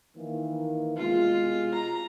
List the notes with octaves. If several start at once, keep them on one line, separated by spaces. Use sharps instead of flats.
D#3 E3 A#3
C2 B2 G#3 F4
A#5